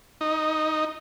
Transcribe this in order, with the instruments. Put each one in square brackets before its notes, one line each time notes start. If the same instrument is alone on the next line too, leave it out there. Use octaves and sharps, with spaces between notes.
[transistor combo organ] D#4